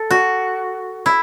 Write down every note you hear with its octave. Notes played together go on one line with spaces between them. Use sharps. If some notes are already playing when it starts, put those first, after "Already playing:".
Already playing: A4
F#4
E4